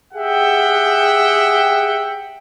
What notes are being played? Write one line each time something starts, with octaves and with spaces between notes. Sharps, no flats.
G4 G#4 E5 F#5 G5